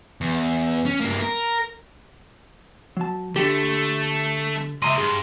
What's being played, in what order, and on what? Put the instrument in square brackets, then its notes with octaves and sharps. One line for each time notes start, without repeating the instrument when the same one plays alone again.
[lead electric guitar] E2
C#4
G2 A#3
A#4
[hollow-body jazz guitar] F#3 A5
[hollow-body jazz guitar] D3 G4 [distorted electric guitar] A3
[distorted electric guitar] C#2 D#5 [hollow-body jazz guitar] E5 A#5 C6
[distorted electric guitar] G2 [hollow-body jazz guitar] G#4 C6